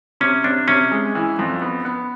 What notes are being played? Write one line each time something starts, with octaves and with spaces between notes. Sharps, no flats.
C3 C#4
C3 D4
C3 C#4
G#3
E3
F2
B3
B3